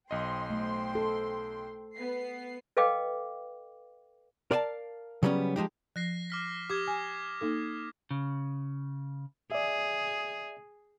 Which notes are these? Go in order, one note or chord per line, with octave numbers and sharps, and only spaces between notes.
B1 C5 D#5 G5 C6
A3
A4
B3 C7
A4 B4 D#5 F5 G5 D6
A#4 D5 F5 G#5 A5
C#3 F#3 G3 A#3 B3 C#4
F3 G#3 D#4 G4
F3 F#6 A#6 C7
D6 F6 B6
G4 D6 D#6 G#6
G#5
A#3 D#4 A4
C#3
G#4 D5 E5